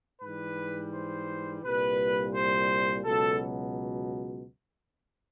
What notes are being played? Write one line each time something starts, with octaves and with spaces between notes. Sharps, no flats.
G#2 E3 G3 B4
C5
C2 A#2 G3 B4
C5
C#2 B2 F#3 A4